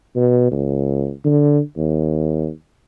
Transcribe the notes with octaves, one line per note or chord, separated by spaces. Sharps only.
B2
C#2
D3
D#2